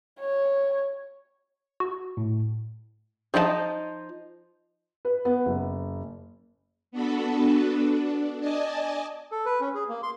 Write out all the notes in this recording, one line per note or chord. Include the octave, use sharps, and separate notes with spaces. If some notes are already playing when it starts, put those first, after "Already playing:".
C#5
F#4
A2
F3 D#4 F4 D#5 A5
B4
B3
F#1
B3 D4 F#4 A4 B4
D4
D5 D#5 G#5 A5
A4
B4
C#4
G#4
A#3
C6